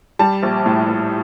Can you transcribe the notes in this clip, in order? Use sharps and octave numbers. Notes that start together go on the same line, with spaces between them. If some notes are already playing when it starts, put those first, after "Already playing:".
G3 A5
A#1
A2
A#1